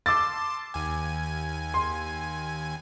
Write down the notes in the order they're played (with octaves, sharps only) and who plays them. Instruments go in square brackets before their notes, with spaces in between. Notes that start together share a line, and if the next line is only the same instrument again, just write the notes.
[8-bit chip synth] A5 C6 [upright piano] D6 E6 A6
[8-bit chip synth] D#2 G#5
[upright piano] C6